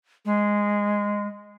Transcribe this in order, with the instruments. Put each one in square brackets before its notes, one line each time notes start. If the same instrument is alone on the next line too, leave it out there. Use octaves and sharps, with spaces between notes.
[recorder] G#3